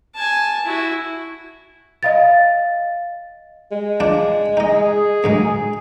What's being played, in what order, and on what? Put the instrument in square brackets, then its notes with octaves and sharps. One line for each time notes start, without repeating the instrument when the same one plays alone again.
[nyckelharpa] G#5 A5
E4 F#4
[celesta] D#5 F5 A6
[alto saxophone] G#3
[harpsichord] F3 D4 D5
[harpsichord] D#4 D#5 [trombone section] G#4
[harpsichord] D2 G#2 F#3